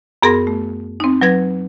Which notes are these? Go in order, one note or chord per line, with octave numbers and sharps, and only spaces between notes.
F#2 B3 G#4 A#4 C6 A#6
A3
C4 D#4
F#3 B4 G#6 A#6